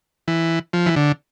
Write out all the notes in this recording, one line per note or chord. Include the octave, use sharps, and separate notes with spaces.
E3
F3
E3
D3